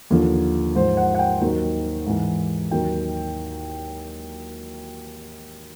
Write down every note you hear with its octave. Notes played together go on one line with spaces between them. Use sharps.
D#2 D3 F3
G#2 F3 C5
F#5
F#5
G5
D#2 D#3 F#3
G#2 E3
D#2 D#3 F#3 G5